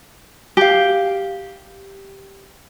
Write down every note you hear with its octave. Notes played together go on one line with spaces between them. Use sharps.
G4 F5